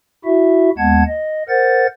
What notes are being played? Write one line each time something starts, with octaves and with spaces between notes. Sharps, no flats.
E4 F#4 E5
D#2 G#3 B3 F#5 A5 G#6
D#5
A#4 C5 F#5 A6